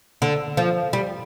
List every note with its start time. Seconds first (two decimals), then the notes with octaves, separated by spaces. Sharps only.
0.22 D3
0.57 F3
0.93 G3